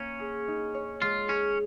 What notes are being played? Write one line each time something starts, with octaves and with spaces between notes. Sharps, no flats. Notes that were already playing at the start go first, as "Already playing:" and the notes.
Already playing: A#3 C#4 C#5
G#4
D#4
C#5
G#3 F4
C#4 G#4